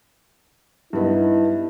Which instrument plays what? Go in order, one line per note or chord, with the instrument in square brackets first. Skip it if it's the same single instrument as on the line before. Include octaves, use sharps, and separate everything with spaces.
[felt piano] G2 B3 D#4 [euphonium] E4